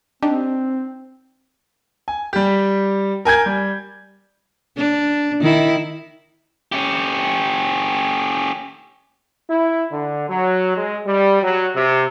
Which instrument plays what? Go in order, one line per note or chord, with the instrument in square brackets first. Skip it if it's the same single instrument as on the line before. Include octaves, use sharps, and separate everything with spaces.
[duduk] C4 [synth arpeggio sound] D4 D#4 G4
[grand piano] G#5
G3 G4
A#4 G#5 G6 G#6
G3
[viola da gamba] D4
D#3 E4
[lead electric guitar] C#4 G4
[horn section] E4
D3
F#3
G#3
G3
F#3
C3